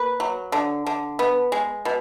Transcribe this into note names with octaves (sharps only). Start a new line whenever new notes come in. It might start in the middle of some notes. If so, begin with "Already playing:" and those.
Already playing: A#3 B4
F#3
D3
D3
B3
G#3
B2